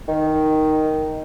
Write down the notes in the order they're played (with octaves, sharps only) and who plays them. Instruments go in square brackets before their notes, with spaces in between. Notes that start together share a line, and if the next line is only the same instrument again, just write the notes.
[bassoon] D#3